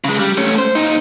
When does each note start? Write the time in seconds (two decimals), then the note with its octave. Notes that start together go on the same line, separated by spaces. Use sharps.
0.04 C#3 G#3
0.19 G3
0.37 A3 C#4
0.58 C5
0.75 A#2 D#4